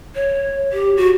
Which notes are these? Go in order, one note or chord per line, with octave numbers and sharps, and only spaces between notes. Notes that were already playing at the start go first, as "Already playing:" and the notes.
C#5
G4
F#4